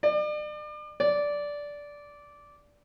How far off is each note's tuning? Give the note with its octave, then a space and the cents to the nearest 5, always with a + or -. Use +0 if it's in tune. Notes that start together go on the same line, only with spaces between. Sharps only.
D5 +40
D5 -10